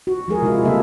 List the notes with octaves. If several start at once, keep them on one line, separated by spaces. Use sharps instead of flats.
F#4
F3 G#3 G#4 A#4
C3 G#3 E4 F4
C#3 G3 A#3 A4 E5